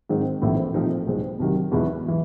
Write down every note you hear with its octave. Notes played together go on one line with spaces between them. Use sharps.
G#2 D#3 G#3 C4
A#1 A2 E3 A3 C4
A#2 F3 A3 C4 D#4
C2 B2 G#3 C4
C2 C3 D#3 F#3
E2 B2 G#3 B3 E4
E3